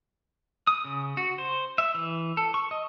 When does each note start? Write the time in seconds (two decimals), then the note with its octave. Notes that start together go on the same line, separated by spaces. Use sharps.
0.67 D#6
0.84 C#3
1.17 F#4
1.38 C5
1.78 E5
1.95 E3
2.37 A4
2.54 C#6
2.71 D#5